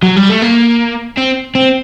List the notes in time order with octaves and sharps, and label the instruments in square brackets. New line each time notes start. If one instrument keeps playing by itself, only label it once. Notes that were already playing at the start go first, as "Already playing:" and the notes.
[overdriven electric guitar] F#3
G3
A3
A#3
C4
C4